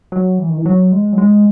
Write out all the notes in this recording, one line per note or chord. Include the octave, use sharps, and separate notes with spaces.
F#3
E3
D#3
E3
F#3
G#3
F#3
G#3